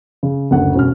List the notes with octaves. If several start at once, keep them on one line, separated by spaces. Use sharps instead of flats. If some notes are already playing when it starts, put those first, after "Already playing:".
C#3
F#1 D2 F#5
E1 C#4 F6